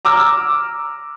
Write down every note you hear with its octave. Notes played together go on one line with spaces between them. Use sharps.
A#5 D6 E6 F6